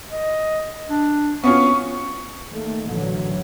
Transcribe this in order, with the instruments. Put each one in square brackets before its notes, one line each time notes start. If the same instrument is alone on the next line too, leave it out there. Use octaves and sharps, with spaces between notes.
[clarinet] D#5
D4
[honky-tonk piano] B3 C#4 F4 [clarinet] C#6
[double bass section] D#3 A3 A#3
A1 D3 E3 F#3